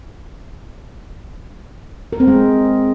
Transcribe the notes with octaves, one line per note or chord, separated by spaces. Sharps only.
A#4
C4
G#3